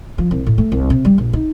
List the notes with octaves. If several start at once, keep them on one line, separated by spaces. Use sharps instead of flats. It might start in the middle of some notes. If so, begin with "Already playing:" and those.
F3
C2
A2
A3
C2
C3
G3
A#1
D#4